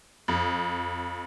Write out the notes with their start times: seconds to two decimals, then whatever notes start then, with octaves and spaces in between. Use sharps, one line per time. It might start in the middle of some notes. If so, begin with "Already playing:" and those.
0.28 F2